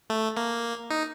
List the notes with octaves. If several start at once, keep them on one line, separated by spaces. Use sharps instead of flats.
A3
A#3
D#4